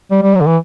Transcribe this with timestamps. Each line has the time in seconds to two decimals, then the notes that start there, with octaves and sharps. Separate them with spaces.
0.11 G3
0.23 G3
0.35 F#3
0.41 D3
0.46 E3